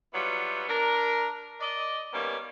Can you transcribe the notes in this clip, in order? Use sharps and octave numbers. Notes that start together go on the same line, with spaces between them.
F#3 G3 B3 E4 F4
D4 A#4
D5 D#5
D#3 G3 A#3 B3 C#4